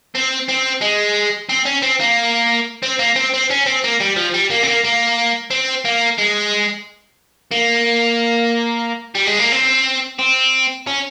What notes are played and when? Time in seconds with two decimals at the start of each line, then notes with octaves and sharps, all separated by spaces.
0.15 C4
0.49 C4
0.82 G#3
1.49 C4
1.65 C#4
1.82 C4
2.00 A#3
2.83 C4
2.99 A#3
3.16 C4
3.34 C4
3.51 C#4
3.66 C4
3.84 A#3
4.01 G3
4.16 F3
4.34 G3
4.50 A#3
4.63 C4
4.67 A#3
4.84 A#3
5.50 C4
5.85 A#3
6.19 G#3
7.51 A#3
9.15 G3
9.27 G#3
9.39 A#3
9.52 C4
10.19 C4
10.87 C#4